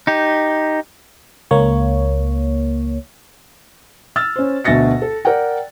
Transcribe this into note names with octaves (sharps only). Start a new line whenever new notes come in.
D#4 G4
C#2 A#3 C#5
E6 F6 A6
C#4 C5
D2 B2 E5 A6 A#6 C#7
A4
A#4 D5 F#5 G5